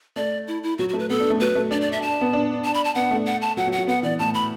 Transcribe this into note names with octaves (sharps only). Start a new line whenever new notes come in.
A3 D5
E4
E4
F#3 F#4
F#4
A3
B4
B3 A4
D4
A3
F#3 B4
A3
D4 D5
D5
E5
A5
B3
D4
A5
B5
A5
B3 F#5
A3
F#5
A5
F#3 F#5
F#3
F#5
F#3
B3 F#5
E3 D5
A2 A5
B5